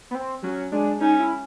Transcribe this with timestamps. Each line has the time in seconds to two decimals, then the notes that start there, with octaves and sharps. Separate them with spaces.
0.11 B3
0.15 C4
0.43 F#3 C#4
0.72 G#3 D4
1.00 C#4 D#4
1.20 E4